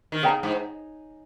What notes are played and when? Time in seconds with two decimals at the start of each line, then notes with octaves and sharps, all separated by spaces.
0.12 D#3
0.22 C#3 G#4 D#5 G5 A#5
0.43 G#2